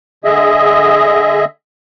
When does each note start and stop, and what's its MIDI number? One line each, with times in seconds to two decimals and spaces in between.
0.24 1.45 50
0.24 1.45 68
0.24 1.45 75
0.24 1.45 76